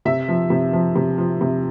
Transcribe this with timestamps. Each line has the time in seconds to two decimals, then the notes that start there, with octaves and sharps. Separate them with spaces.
0.05 C3 E5
0.28 F3
0.50 C3
0.73 F3
0.95 C3
1.18 F3
1.41 C3